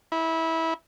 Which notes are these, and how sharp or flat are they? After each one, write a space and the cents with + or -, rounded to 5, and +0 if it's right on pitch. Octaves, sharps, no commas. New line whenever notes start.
E4 -20